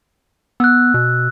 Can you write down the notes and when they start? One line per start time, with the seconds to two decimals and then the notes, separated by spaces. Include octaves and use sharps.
0.60 B3 E6 F#6
0.94 B2